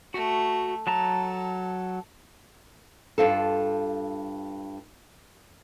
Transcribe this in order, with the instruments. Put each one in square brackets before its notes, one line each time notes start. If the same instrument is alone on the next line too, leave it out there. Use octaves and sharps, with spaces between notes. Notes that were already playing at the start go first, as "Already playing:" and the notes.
[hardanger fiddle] A3 [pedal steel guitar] F#4
[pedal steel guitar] F#3 A5 A#5 [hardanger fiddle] A4
[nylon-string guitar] G2 F4 A4